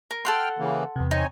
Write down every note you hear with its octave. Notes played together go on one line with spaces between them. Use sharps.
A#4
A4 F#5 G5 C6 F6
C#3 E3 A#3
E2 C3 B3
C4 D#4 C#5 G#5